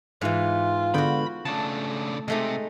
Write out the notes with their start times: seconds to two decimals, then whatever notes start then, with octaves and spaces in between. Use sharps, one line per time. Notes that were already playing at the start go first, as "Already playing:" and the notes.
0.21 G#2 E3 F4
0.94 G#2 D3 B3 F#4 G5 B5
1.45 C#3 A3 D4 A5
2.28 C3 G#3 A3 D#4